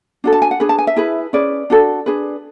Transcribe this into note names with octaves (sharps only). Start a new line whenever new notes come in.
D4 F#4 A4
A5
G#5
F#5
D4 G#4 B4
A5
G#5
E5
E4 G#4 B4
C#4 G#4 B4 D5
D4 F#4 A4
D4 G#4 B4